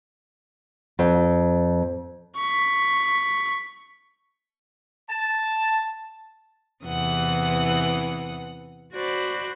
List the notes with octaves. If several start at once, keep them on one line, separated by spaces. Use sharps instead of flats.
F2
C#6 B6
A5
E2 C3 E3 F#5 D#6
F#4 C5 D5 B5